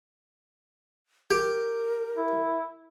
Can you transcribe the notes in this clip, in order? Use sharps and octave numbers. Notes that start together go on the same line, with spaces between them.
G4 A#4
E4